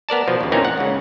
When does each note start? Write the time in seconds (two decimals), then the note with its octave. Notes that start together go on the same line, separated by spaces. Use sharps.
0.09 B3 A#4 D5 A5
0.28 B2 F3
0.41 D#2 C#3
0.52 A#2 E3 C4 C#4 D#4 A#4
0.65 F#5
0.78 C#2 C#3